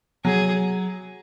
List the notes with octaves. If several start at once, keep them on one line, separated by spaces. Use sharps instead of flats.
F#3 G#4